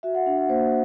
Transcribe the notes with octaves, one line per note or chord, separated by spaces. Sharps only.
F#4 E5
F#5
D4 F#5
F#5
A#3 C5